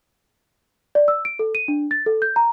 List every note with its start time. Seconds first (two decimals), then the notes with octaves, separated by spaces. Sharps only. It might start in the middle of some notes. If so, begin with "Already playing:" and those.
0.95 D5
1.08 E6
1.25 D7
1.39 A4
1.55 D#7
1.68 D4
1.91 A6
2.06 A4
2.22 G6
2.36 A#5